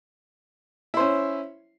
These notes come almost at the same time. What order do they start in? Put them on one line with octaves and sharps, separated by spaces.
E4 C5 C#4